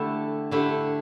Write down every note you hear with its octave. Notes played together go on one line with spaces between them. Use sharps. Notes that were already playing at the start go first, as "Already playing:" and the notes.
Already playing: D3 A3 E4 G4
D3 A3 E4 G4